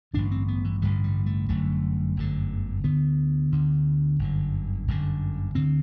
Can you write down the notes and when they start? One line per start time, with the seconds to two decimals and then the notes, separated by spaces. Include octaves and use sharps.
0.14 A1 G2 D3 D4
0.31 C4
0.48 B3
0.64 E3
0.82 A1 G2 D3 G3
1.04 G3
1.26 A3
1.49 G1 F#2 D3 A3
2.17 G1 F#2 D3
2.84 D2 D3 B3
3.52 D2 D3
4.19 G1 F#2 D3
4.88 G1 F#2 D3
5.55 D2 D3 C4